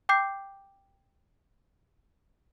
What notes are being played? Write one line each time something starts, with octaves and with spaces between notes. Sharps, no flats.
G5 D6 G6 C7